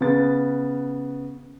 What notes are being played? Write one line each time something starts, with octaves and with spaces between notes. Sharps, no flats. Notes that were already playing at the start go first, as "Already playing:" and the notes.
C#3 B3 A6